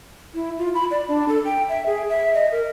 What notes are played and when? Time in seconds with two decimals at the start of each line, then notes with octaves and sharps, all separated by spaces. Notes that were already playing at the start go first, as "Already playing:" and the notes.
0.35 E4
0.59 F4
0.74 B5
0.91 D5
1.08 D4
1.28 A4
1.45 G5
1.69 E5
1.86 G#4
2.09 E5
2.34 D#5
2.52 A#4